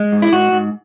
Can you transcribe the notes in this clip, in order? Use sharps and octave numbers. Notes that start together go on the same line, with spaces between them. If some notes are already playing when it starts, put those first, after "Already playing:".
Already playing: G#3
G#2
E4
G#2 F#4
G#2